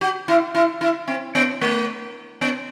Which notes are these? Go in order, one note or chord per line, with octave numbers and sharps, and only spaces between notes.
F#4
E4
E4
E4
C4
B3
A3
B3